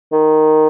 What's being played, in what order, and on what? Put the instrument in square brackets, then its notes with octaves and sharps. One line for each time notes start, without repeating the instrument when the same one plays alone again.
[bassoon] D#3